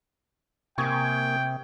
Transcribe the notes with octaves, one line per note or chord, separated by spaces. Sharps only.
C3 A#3 G5 G#5 C#6 D#6 G#6